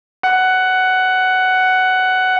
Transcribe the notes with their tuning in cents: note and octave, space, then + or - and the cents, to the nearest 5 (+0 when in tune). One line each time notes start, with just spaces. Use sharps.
F#5 +10